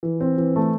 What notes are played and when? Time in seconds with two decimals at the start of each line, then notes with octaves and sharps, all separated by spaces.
0.03 E3
0.21 C4
0.38 E3
0.56 A3